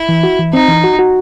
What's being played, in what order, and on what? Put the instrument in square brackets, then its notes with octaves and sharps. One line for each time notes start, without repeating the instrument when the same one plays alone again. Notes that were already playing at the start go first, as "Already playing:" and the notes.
Already playing: [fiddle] E4
[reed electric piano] E3
F#4
E3
[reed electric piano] C4 [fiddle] D#4
[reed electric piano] E3
F#4
F#4